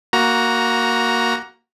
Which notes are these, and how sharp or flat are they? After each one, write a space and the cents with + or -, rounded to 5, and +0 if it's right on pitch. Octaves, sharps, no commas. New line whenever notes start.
A#3 +0 F#4 +0 A#5 +15